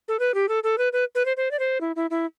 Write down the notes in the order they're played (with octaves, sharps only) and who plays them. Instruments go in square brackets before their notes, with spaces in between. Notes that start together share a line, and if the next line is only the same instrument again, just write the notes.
[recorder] A4
B4
G4
A4
A4
B4
B4
B4
C5
C5
D5
C5
E4
E4
E4